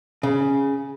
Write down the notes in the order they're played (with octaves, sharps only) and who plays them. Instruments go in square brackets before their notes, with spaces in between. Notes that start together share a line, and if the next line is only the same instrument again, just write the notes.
[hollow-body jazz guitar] C#3